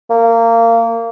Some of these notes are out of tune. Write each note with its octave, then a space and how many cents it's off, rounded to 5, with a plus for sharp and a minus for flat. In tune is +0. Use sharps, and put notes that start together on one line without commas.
A#3 -20